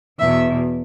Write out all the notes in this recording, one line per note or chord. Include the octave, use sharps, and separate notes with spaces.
E2 B2 E5